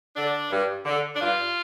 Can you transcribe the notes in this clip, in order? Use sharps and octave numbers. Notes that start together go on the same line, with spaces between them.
D3 D4
G2
D3
D4
G2 F4